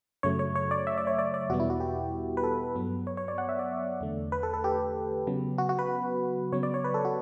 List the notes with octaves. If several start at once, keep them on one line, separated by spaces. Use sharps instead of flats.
F#2 C#3 F#3 A3 C#5
C#5
C#5
D5
E5
D5
C#5
D5
D5
E2 B2 G3 B3 F#4
E4
F#4
G4
B4
A4
G2 F#3 B3
C#5
C#5
D5
F#5
E5
D5
E2 D3 A3
B4
A4
A4
G4
C#3 F#3 B3
F#4
F#4
B4
C#3 F#3 B3 C#5
D5
C#5
B4
A4
F#4